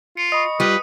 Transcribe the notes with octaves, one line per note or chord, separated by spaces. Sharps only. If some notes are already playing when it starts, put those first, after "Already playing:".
F4 C#7
D#5 B5 C#6 D#6
G3 F4 B4 D#7